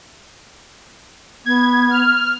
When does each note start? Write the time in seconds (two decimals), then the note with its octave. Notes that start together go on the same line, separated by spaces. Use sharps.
1.46 B3 G#6
1.90 F6